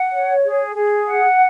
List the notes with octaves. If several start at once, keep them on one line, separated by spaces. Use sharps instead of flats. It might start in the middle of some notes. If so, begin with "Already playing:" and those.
Already playing: F#5
C#5
G#4
G#4
F#5